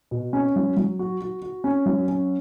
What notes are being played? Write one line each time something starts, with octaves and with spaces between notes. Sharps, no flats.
B2
C#4
F#3
F#3
F#4
F#4
F#4
C#4
F#3
C#4